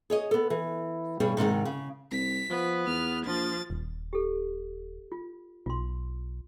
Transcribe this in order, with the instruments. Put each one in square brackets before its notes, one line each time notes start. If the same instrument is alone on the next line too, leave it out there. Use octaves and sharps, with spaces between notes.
[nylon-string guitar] G#4 C#5 D#5
B3 A4
E3
G2 B2 G3 G#4 C#5
G#2 C3 D#3 G#3
C#3
[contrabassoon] C2 [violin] B6
[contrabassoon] F3 [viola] B3
[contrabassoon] E2 [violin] F6
[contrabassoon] A#1 [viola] F3 [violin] A6
[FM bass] D#1
[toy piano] G4 A4
F4
[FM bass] B1 [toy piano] F4 C6